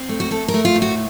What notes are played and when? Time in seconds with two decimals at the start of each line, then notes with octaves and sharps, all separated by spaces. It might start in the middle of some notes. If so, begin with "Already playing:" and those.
Already playing: C4
0.09 A3
0.20 F#4
0.31 A3 A4
0.48 A#4
0.54 A3
0.65 F4
0.76 A2
0.82 F#4